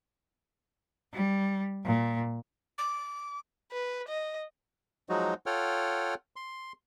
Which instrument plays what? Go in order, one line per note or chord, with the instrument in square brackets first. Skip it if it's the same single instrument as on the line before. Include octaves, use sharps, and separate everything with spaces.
[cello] G3
A#2
[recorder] D6
[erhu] B4
D#5
[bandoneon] F3 F#3 G#3 D#4 F#4
F4 A4 C#5 F#5 G5 F6
C6